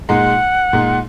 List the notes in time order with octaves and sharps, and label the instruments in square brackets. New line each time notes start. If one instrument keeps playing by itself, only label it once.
[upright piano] A#2 G#3 D#4 [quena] F#5
[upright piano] A#2 G#3 D#4